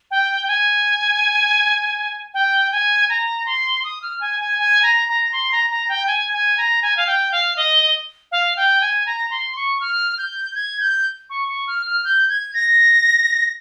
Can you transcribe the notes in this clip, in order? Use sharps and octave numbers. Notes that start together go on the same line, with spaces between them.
G5
G#5
G5
G#5
A#5
C6
D#6
F6
G#5
G#5
G#5
A#5
A#5
C6
A#5
A#5
G5
G#5
G#5
A#5
G#5
F5
G5
F5
D#5
F5
G5
G#5
A#5
C6
C#6
F6
G6
G#6
G6
C#6
C#6
F6
F6
G6
G#6
A#6